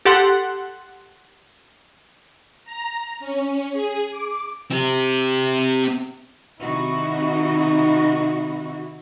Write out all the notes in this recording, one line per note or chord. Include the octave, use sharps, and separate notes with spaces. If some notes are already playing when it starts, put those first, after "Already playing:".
G4 A4 F#5 C6 F#6
A#5
C#4
G#4
D6
C4 G4
C3 D#3 D#4 E4 F#4